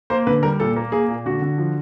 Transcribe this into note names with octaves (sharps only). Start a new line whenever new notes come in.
A#3 C5
D3 B4
G3 A#4
A#2 A4
A#3
A#3 G#4
A#2
D3 F#4
D3
F3